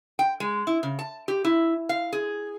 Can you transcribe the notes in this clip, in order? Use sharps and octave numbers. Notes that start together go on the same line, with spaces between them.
G5
G#3
E4
C#3
A5
G4
E4
F5
G#4